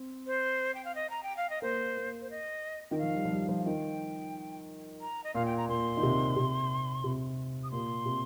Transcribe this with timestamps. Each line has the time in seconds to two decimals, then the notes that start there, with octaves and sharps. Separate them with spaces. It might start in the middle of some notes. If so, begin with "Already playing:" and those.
Already playing: C4
0.27 C5
0.75 G5
0.85 F5
0.95 D#5
1.10 A#5
1.23 G5
1.37 F5
1.50 D#5
1.62 A#3 C5
1.97 A#3
2.21 C5
2.30 D#5
2.91 D#3 G5
2.98 F3 F5
3.15 G3
3.25 F3
3.31 G3
3.49 F3
3.59 F5
3.65 D#3 G5
5.01 A#5
5.24 D#5
5.35 A#2 F5
5.46 G5
5.58 A#5
5.68 A#2 C6
5.97 D#3
6.03 C3
6.36 C3
7.04 C3
7.64 D#6
7.71 A#2 C6
8.06 C3